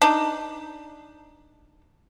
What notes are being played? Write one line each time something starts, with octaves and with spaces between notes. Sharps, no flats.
D4 D#4